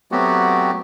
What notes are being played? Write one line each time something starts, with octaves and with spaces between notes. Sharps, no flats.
F#3 A3 B3 C4 F#4 G4